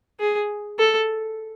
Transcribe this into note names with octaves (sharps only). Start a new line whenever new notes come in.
G#4
A4